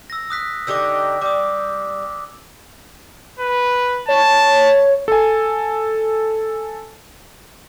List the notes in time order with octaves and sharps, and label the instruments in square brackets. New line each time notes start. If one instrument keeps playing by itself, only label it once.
[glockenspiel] E6 A#6
D#6 F#6 B6
[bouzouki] D3 D#4 G4 [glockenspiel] D6 E6
[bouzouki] G3 [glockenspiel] D6 D#6
[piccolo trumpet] B4
[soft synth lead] C#5 [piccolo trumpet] A5
[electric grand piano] A4 G#5